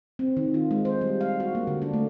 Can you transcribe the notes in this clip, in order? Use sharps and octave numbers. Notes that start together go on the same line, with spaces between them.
C4
D#3
F4
G#3
C5
G3
F5
F#4
A#3
D3
D4
A3